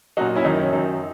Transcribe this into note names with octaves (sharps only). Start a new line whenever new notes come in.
A#2 F#3 D#4 F#4
C#4 E4
F#2 D#3 F#3 D#4
C#4
F#2 D#3 F#3 D#4